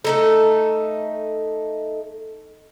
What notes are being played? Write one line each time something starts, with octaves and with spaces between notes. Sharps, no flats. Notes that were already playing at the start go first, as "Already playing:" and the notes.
A3 D#4 A4